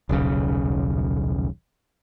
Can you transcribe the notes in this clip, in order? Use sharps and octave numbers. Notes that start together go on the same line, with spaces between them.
D#1 B1 C#3